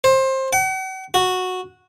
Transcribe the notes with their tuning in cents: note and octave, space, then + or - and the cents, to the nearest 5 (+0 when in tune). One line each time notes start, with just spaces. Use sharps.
C5 +20
F#5 +45
F#4 -10